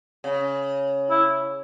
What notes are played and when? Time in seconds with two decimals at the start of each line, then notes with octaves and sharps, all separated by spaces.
0.24 C#3
1.10 E4